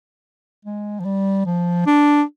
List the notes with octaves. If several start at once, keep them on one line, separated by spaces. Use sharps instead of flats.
G#3
F3
G3
F3
D4